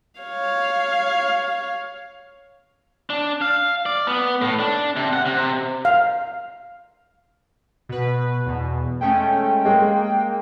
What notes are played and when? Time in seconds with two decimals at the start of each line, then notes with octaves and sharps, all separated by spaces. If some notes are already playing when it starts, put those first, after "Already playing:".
0.20 C#5 F5
3.10 D4
3.41 F5
3.86 D5
4.07 B3
4.42 A2
4.59 D4
4.96 C3
5.13 F#5
5.26 C3
5.85 F5
7.89 B2 B4
8.46 E2 B2
9.01 G#3 A3 C#4 G5
9.66 G#3 A#3